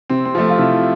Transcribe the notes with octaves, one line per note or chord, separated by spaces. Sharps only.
C3 C4
C4
F3 A3
F4
C3 E4